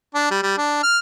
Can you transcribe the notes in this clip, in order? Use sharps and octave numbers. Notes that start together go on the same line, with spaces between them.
D4
G3
G3
D4
F6